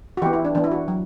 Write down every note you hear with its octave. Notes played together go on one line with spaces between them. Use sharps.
F#4
E3 B3 G4
E4
D4
E3 B3 D4
E4
F#4
F#3